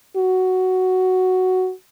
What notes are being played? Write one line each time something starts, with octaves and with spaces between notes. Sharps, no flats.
F#4